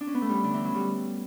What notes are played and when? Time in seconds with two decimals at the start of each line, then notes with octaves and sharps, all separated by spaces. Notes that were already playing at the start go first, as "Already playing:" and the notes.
0.01 D4
0.07 C#4
0.15 B3
0.22 A3
0.29 G3
0.44 D3
0.54 E3
0.65 F#3
0.75 G3